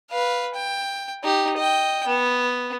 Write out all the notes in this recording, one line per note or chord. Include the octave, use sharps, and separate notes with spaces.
B4 F5
G5
D#4 G4
D#5 G5
B3